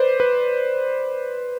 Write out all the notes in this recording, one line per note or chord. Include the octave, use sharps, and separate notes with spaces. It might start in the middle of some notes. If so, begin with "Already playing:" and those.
Already playing: B4 C5 D5
B4